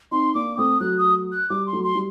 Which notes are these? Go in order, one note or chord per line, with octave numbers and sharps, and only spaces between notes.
C4 D#4 C6
A#3 D4 D6
A3 C4 D#6
F#3 A3 F#6
D#6
F#6
G3 D6
C6
F#3 A3
C6
G3